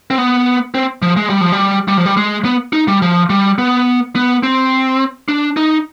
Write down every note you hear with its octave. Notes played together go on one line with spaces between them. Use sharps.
C4
B3
C4
F3
G#3
G3
F3
G3
G3
F3
G3
G#3
B3
D#4
G3
F3
G3
B3
B3
C4
D4
D#4